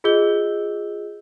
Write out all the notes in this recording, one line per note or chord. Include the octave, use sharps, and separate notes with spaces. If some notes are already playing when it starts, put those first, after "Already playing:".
F4 G#4 D#5 E6 G6 G7